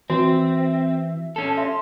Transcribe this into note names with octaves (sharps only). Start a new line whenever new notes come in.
E3 C4 F#4 E5
C#4 A4 A5
E5 C6